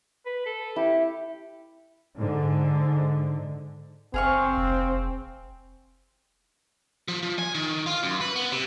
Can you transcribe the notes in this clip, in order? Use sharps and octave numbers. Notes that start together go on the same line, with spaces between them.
B4
A4
E4 G4
G#2 D3
F#1 C4 G#4 F5 C#6
F1
F3
F3
G#5
D#3
F4
F#2
B4
B3
C3